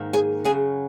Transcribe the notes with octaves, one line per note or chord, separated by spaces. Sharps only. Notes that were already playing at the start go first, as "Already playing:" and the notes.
Already playing: G#2 D#3 A#3
G#4 G#5
F#2 C#3 F#3 G#4 G#5